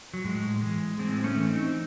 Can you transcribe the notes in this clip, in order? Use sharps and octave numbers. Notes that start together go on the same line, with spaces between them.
F#3
A2 G#3
E3 G#3
A2 G#3 C4
A3 C#4
E3
C4 D#4